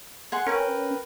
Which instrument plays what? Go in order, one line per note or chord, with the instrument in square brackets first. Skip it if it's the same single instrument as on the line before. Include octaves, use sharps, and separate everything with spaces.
[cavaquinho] G#4 F#5 C6
[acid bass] C#4 [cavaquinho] A#4 B4 G5